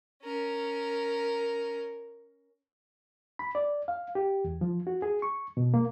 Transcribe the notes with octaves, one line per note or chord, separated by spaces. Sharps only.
C#4 A#4
B5
D5
F5
G4
E2
F3
F#4
G#4
C#6
B2
A#3